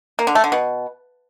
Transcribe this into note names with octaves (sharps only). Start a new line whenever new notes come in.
A#3
D3
A3
D3
B2